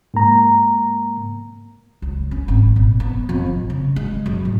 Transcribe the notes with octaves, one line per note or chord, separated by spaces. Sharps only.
G#2 A#3 A#5
C#2
C#4
G#1
A#2
B3
F2
A1
C#3
G#3
F#2
A2